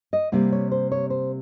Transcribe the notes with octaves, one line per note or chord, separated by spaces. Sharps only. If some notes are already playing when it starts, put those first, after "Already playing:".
D#5
C3 G3 A#3 F5
C#5
C5
C#5
C5